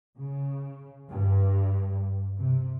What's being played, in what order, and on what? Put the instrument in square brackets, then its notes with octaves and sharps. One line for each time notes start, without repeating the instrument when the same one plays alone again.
[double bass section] C#3
G2
C3